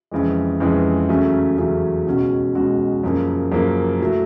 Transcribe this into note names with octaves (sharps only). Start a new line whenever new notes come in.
F2 C#3 E3 G#3
F2 C#3 E3 G#3
E2 C#3 F#3 A3 C#4
E2 C#3 F#3 A3 C#4
C#2 B2 G#3 C#4 F#4
C#2 B2 G#3 C#4 F#4
F#2 C#3 F3 A#3
F#2 C#3 F3 A#3
A2 F#3 A3